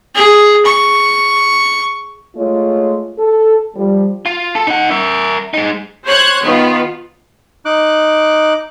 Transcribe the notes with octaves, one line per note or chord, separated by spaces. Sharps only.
G#4
C#6
G#3 A3 F4 C#5
A4
F3 G3
F4
A4
D#4 F#5
A#4 E5
G#3 D#4
C5 C#5 F#6 G#6
D#3 B3 F4
D#4 D6 F#6